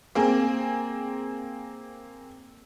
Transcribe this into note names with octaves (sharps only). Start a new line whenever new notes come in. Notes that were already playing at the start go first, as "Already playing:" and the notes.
A#3 C4 G#4